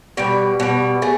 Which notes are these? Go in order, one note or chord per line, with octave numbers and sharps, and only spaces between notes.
B2 G3 D5
B2 G3
A3 G#4